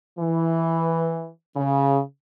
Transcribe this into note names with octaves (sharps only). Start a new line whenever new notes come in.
E3
C#3